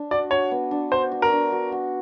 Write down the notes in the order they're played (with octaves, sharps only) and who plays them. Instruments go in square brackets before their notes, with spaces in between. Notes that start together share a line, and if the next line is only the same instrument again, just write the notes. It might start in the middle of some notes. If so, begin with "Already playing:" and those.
Already playing: [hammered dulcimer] D4
[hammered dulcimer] F#4 [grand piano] D5
[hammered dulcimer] F#4 [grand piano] C#5
[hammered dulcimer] B3
D4
[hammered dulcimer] F#4 [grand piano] C5
[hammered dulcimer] F#4
[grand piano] A#4
[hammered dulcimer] D4
F#4
F#4